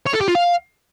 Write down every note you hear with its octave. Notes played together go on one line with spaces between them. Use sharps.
C#5
A4
G4
F4
F5